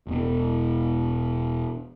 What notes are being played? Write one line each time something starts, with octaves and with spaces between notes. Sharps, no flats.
E1 B2